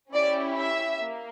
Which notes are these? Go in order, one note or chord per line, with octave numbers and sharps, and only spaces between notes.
C#4 E4 G4 D5
E5
A#3